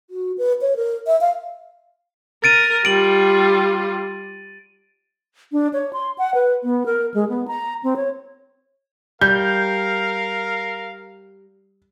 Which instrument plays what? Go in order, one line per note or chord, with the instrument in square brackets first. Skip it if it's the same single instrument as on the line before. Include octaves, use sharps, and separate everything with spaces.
[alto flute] F#4
B4
C#5
A#4
E5
F5
[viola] A#4 [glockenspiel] A6 D7 D#7
[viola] G3 F4 [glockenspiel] D7 F#7
[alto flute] D4
C#5
C6
F#5
B4
B3
A#4
G#3
B3
A#5
C4
C#5
[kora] G3 [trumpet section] A#4 F5 [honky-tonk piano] G6